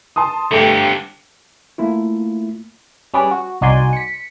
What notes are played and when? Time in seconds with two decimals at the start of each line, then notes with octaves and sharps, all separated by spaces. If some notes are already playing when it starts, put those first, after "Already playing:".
0.16 A5 C6 D#6
0.51 G2 D3 A3 G4
1.78 A3 A#3 E4 F4
3.14 G3 C#4 G#4 B4 D5
3.31 F#4
3.61 C2 D#4 F#4 D5 G#5 C6
3.93 B6 C#7